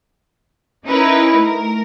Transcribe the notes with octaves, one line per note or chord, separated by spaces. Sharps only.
C#4 D#4 E4 A#4 B4
A3 A#4